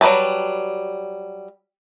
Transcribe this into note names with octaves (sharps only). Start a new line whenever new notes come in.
F#3 G3 A#3 B4 A5